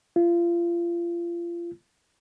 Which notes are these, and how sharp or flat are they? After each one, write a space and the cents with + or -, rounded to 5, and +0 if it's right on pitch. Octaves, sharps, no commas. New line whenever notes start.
F4 -30